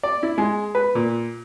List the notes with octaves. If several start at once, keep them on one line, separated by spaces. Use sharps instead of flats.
D5
E4
G#3
B4
A#2